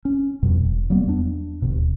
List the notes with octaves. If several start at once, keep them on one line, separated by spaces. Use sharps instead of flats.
C#4
F2 B2 G3
E1
F#3 G3 A#3 B3
E2 B3 D4
D1 D#2 B2